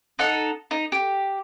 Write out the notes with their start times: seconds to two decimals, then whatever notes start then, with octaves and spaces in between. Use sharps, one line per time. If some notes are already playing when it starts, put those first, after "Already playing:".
0.19 D#4 A4 F#5
0.71 D#4
0.92 G4